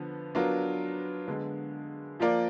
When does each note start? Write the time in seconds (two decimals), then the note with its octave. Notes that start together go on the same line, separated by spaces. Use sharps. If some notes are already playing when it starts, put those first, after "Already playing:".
Already playing: D3 F3 B3
0.35 F#3 B3 D4 F4 A#4
1.27 D3 G#3 B3
2.20 F3 A#3 F4 A#4 D5